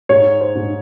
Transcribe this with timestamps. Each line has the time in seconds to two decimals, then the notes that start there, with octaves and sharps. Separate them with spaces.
0.09 G#2 C#5
0.41 C5
0.55 G#2